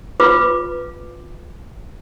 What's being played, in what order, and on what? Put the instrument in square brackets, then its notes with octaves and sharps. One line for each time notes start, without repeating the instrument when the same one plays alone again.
[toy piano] F4 B4 D6